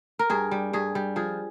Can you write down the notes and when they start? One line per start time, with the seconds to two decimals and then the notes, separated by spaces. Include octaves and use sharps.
0.19 A#4
0.30 G2 G#4
0.51 G3
0.73 G2 G#4
0.95 G3
1.16 F3 G#4